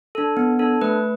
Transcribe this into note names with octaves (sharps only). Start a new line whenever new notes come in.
D4 A4
B3
D4 A4
A3 B4